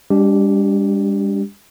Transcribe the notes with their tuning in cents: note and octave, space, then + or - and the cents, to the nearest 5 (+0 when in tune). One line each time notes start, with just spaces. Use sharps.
G3 +45 D4 -25 G4 -10